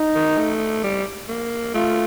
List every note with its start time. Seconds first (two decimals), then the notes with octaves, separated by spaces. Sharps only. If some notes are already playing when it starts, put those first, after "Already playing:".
Already playing: D#4
0.15 D#3
0.38 A3
0.84 G3
1.29 A#3
1.74 A3 F4